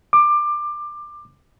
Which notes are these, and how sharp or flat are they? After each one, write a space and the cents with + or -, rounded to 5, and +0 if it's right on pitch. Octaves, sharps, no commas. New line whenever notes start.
D6 +20